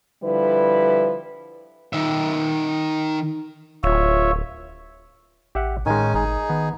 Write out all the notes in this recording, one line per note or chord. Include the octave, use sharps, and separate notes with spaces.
D3 F3 G3 E4 B4
D#3 E5
D1 F4 C#5 E5
A1 G4 E5 F#5
A2 D#3 G#3 C#4 D#4 G#5
G#1 D#4 G#4
D#3 B3